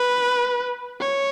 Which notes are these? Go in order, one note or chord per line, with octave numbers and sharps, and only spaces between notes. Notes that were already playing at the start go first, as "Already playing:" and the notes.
Already playing: B4
C#5